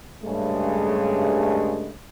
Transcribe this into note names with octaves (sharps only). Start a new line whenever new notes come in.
G2 C#3 G#3 A3